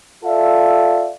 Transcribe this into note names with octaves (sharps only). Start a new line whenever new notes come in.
F4 A4 D5 E5 F5